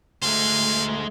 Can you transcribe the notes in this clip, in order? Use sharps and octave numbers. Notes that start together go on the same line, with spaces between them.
D2 G#3 A3 C5 F5